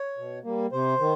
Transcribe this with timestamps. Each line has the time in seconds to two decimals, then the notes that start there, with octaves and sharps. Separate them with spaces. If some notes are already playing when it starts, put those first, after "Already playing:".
Already playing: C#5
0.18 B2
0.44 G3 A#3
0.72 C3 C5
0.99 D#3